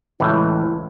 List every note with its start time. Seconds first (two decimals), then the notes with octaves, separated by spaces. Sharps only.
0.20 C#2 A2 E3 E4